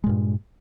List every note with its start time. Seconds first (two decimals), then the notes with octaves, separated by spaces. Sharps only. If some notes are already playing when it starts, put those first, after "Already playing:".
0.04 G#3
0.06 A#2
0.09 G2